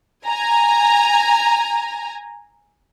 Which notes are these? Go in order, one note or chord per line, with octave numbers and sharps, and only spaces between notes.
G#5 A#5